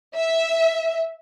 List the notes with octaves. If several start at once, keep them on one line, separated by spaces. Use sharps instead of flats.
E5